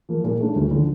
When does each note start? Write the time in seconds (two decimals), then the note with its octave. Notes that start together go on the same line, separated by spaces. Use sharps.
0.09 F3 A#3
0.24 A#2
0.40 A3 D4
0.56 D2
0.71 D3 F3